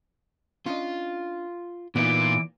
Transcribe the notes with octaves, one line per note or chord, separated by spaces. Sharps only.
C#4 D4 F4 D#5
A#2 E3 B3 D#4 F4 D6